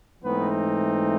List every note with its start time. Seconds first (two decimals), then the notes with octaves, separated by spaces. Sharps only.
0.24 G#2 E3 A3 B3 C4 D#4 B4